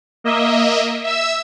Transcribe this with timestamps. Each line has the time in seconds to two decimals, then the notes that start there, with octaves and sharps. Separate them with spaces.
0.24 A#3 D#5 E5
1.04 E5 E6